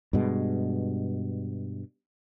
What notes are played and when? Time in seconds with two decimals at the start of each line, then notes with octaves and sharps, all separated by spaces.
0.13 G2 B2 G#3